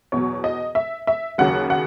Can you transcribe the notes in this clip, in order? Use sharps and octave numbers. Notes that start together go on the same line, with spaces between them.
E2 B2 F#3 C#5
D#5
E5
E5
D#2 C#3 F#3 F#5
F#5